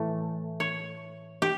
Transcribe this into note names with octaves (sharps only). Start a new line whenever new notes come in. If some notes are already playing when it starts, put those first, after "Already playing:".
Already playing: A2 E3 A3
C#5
G4